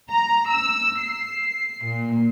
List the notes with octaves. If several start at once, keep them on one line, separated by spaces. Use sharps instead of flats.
A#5
E6
C7
A#2